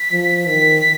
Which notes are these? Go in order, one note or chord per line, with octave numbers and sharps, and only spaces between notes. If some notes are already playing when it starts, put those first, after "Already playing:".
Already playing: B6
F3
D#3 B6